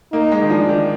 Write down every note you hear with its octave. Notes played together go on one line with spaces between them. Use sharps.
A#3 D#4
G#3
D#3
F3 D4
D#3